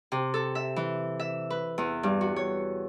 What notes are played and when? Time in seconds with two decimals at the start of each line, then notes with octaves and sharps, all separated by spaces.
0.12 C3
0.34 A4
0.55 E5
0.76 E3
1.20 E5
1.50 B4
1.78 E2
2.03 G2
2.21 F#4
2.36 C#5